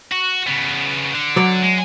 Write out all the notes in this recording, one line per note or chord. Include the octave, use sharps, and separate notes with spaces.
F#4
C#3 B3
D3
F#3 D5
G#3